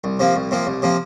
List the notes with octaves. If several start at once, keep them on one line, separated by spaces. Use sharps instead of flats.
C2
C3 F3 A#3
C2
C3 F3 A#3
C2
C3 F3 A#3